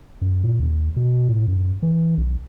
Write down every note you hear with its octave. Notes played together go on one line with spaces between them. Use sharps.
F#2
A#2
D#2
B2
A2
F#2
E3
B1